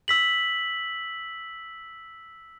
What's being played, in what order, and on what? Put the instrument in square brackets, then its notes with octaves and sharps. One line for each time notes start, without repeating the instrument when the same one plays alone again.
[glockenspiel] E6 B6 F#7